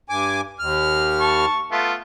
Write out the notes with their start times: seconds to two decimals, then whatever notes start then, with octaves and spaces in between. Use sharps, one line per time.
0.09 G2 G#5 D6
0.59 D#2 F6
1.20 A5 C#6
1.72 A3 B3 F4